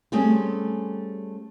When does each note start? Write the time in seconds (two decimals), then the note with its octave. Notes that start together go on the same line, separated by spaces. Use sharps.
0.12 G3 A3 C4 C#4 G4 G#4